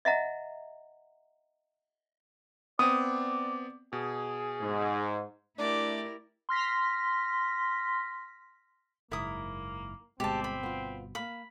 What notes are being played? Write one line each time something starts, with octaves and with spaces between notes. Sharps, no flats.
D#5 E5 F#5 A#5
B3 C4 D5 D#6
B2 G#4
G#2
A3 D4 E4 G4 A#4 D5
C6 F6 A#6 B6
F#1 G#2 A#3 E4 A#4 D#6
G1 B2 G#3 C4 G4 A5
B5
B3 F4
A#3 F5 B5